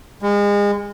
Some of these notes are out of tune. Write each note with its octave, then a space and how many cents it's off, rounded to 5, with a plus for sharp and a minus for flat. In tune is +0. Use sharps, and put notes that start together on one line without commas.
G#3 -30